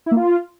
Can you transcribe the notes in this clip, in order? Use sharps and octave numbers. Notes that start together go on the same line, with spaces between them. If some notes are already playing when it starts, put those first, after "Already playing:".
E4
A#3
F4